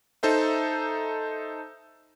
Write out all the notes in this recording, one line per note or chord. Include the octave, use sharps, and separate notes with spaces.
D#4 A4 C5 E5